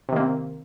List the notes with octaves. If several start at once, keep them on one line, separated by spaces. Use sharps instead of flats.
C3 D#3 A#3 C4